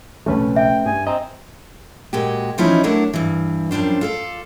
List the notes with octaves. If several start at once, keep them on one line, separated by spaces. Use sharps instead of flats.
D#2 D3 G3 A3 C#4 B4
A#1 C3
E5 G5
G2 G#5
C4 D#5 A#5
A#2 G#3 F#4 G4
E3 F3 C#4 D#4 E4
F#3 A3 D4 E4 A#4
G2 E3
F#2 F3 G3 D4 C5
F4 A4 D5